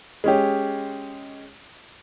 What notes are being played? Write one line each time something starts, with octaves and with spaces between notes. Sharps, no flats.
G#3 C#4 G4